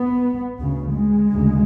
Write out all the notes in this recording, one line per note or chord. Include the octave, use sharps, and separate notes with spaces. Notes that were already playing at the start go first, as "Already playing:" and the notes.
Already playing: B3
D2 C#3
G#3
D2 C#3